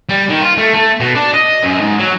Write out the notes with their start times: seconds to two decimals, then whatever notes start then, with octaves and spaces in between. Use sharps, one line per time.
0.09 G3
0.29 D#3
0.42 F4
0.58 A3
0.74 A3
1.00 B2
1.15 D4
1.34 D#5
1.63 F#2
1.81 G#2
1.99 F#3